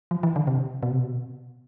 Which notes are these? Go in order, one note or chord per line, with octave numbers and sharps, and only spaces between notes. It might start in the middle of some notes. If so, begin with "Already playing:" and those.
F3
E3
D3
C3
B2
C3
B2